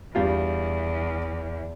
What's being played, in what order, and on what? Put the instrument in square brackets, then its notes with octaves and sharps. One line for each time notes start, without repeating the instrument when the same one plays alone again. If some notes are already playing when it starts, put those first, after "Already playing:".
[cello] E2 [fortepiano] G2 G3 F4